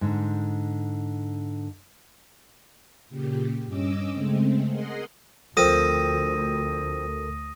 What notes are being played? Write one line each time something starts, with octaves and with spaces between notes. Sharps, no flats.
G#2 D3
A#2 C#3 G4
G2 C#4 D#5 D6 E6
C#3 G#3 A3 C4
G#4 A#4 D#5 F#5 C6
D2 F3 C4 A4 A#4 D#6 A#6 D#7